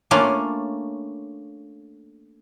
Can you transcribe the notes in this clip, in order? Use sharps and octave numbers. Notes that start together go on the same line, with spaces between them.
A3 A#3 C#4 D4 F4